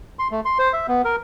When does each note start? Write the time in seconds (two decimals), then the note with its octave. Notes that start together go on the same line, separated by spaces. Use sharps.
0.19 C6
0.31 A3
0.45 C6
0.59 C5
0.73 E5
0.88 B3
1.05 A#4